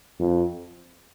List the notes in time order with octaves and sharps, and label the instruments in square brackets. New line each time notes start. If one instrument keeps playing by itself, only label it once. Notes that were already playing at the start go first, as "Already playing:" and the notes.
[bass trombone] F2